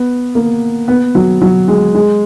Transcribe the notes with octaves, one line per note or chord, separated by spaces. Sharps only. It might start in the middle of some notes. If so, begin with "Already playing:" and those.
Already playing: B3
A#3
B3
F#3
F#3
G#3
G#3